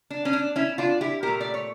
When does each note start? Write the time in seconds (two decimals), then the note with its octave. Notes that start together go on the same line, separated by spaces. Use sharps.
0.10 D4
0.25 C#4
0.33 D4
0.56 C#4 E4
0.78 D4 F4
1.01 E4 G4
1.23 A#2 A3 G4 A#4
1.41 D5
1.54 C#5